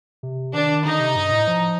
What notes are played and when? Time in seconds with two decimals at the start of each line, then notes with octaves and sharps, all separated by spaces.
0.23 C3
0.54 D#3 D4
0.85 D3 D#4
1.00 C3
1.16 G2
1.32 A2
1.47 F3